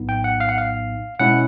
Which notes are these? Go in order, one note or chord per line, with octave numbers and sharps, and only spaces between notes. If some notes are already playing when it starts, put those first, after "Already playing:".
Already playing: A#1 A2 F#3 B3 D#4
G5
F#5
F5
F#5
F5
B2 G#3 C#4 E4 F#5